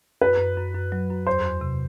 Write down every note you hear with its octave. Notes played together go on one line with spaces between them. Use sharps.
F#2 B4
F#2
F#2
F#2
F#3
F#2
E2 C5
E2
C3